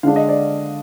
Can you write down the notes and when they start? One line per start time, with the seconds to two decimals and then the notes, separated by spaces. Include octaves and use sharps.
0.03 D3 G#3 D4 F5
0.16 D#5
0.29 D5